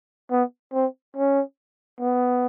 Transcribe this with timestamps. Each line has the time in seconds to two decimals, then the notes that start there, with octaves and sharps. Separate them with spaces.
0.31 B3
0.73 C4
1.16 C#4
2.00 B3